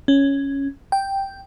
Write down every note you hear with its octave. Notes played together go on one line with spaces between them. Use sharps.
C#4
G5